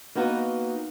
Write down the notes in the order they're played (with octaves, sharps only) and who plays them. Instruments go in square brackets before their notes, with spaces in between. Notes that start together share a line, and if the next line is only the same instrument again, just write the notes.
[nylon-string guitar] A#3 B3 D#4 F#4